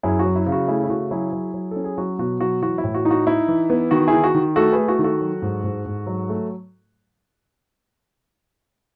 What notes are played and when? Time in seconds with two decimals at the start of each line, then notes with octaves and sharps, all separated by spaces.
0.03 F#2 E4 G#4
0.19 F#4
0.25 F#3
0.35 E4
0.46 C#3
0.52 F#4
0.68 A3 E4 G#4
0.84 E4
0.90 C#3 F#4
1.11 F#3 E4 G#4
1.33 F#3
1.54 F#3
1.71 C#4 A4
1.84 G#4
1.98 F#3 F#4
2.19 B2 F#4
2.40 F#3 F#4
2.62 E3 F#4
2.78 E4
2.84 A2
2.94 F#4
3.05 D#4
3.11 F#4
3.27 D#4 E4
3.48 E3
3.70 B3
3.91 D#3 F#4
4.08 E4 G#4
4.13 D#3
4.24 F#4
4.35 D#3
4.56 A3 F#4 A4
4.72 A3 G#4 B4
4.88 F#4
4.99 D#3
5.04 F#4 A4
5.21 F#3
5.42 G#2
5.64 G#2
5.86 G#2
6.07 F#3
6.29 A3